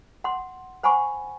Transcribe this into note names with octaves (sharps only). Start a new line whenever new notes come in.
F#5 C6
C5 F#5 G#5 B5 C#6